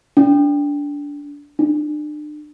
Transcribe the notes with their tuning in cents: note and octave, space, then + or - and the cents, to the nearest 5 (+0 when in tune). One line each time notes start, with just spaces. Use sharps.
D4 -20
D4 +35